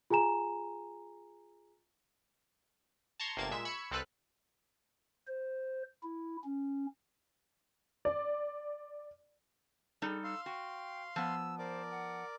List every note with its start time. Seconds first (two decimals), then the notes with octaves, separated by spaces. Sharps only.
0.10 F4 G#4 G#5 A#5 E7
3.20 A5 A#5 C6 C#6 G#6
3.37 G1 C3 A#3 A5 G#6 E7
3.51 A#2 G#3 E5 E7
3.65 B5 C#6 E6 G#6 C#7
3.91 C2 C4 A4 B4 F6 F#6
5.27 C5
6.03 E4
6.44 C#4
8.05 D5
10.02 G3 D#4 G#4 A4
10.24 F5 C6 E6
10.46 F#4 G5
11.16 F3 B3 E6
11.59 A#4 C5 D5 D6
11.91 F#5